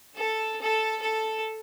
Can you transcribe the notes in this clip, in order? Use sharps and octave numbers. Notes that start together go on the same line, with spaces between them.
A4
A4
A4